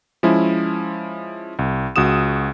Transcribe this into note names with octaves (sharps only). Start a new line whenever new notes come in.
F3 G#3 C#4 E4
C2
C#2 F#4 D#6 E7